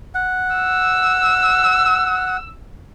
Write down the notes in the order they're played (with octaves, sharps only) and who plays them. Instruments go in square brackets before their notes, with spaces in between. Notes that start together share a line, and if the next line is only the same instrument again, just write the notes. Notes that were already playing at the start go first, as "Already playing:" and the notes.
[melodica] F#5
[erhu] E6